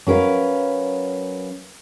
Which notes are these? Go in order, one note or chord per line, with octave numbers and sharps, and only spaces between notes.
F#3 C#4 A#4 B4 F5